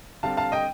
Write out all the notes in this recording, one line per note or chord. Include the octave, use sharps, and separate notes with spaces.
D3 G3 C4 F5 A5
F5 A5
D#5 G5